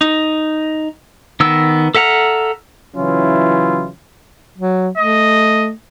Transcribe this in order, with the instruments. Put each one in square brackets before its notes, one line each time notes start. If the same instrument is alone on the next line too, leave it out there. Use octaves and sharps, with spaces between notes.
[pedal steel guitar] D#4
D#3 B3 E6
A4 E5 F#5 A#5 F6
[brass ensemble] C#3 E3 F#3 C#4 E4 F4
[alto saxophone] F#3
[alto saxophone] A3 [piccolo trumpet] D#5